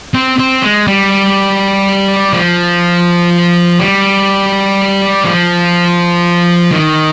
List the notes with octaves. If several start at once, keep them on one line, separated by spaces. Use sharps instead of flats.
C4
C4
G#3
G3
F3
G3
F3
D#3